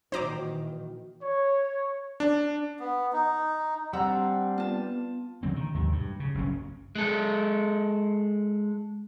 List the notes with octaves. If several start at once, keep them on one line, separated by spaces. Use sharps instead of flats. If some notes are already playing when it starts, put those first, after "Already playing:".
A#2 D#3 E3 D#4 F#4 C5 A#5 D6
C#5
D4
B3
D#4
G3 C4 D4 F#5 A#5 E6
B3 F4 A5
B2 D3 A3 C4
D#3
D#2 G#2 C3 D#3
G2
C#3
F#1 G2 C#4
G#3 A4